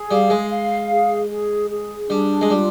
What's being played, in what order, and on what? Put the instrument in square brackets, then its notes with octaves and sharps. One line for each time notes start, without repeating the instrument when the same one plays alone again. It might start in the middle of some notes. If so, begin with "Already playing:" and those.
Already playing: [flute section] G#4
[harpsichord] G3 [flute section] F5
[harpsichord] G#3
[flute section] F5
G#4
G#4
G#4
[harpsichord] G3 [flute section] D4
[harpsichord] G#3
[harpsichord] G3 [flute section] F4